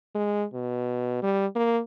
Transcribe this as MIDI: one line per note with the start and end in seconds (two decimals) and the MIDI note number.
0.15 0.44 56
0.54 1.18 47
1.23 1.47 55
1.56 1.80 58